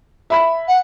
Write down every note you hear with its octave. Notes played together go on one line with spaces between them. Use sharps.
E5 B5 B6
F#5